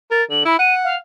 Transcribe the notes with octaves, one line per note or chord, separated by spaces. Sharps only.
A#4 A6
D3 F#7
E4 B5
F#5 D#7
F5